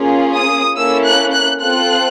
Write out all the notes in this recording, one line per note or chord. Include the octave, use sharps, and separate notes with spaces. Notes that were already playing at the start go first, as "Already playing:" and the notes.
Already playing: A#3 C#4 F4 G#4
D#6
A#3 C#4 E4 A4 E6
F#6
F#6
C4 F4 A4 F#6